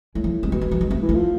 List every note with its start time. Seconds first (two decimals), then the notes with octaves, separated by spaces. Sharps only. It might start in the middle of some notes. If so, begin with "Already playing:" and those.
0.15 A2 G#3
0.24 F3
0.43 C3 G#3
0.52 B2 A3
0.61 G#3
0.71 F3
0.81 G#3
0.90 C3 A3
1.02 E3
1.09 A3
1.15 F3